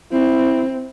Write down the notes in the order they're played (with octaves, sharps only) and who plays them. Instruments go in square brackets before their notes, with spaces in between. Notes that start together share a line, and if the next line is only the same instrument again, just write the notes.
[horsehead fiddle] C4 [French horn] E4